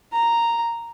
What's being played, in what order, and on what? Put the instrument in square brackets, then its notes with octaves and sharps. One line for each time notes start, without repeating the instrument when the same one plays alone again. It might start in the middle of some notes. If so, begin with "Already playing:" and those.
[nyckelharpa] A#5